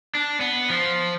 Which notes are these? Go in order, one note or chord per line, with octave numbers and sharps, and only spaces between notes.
D4
B3
F3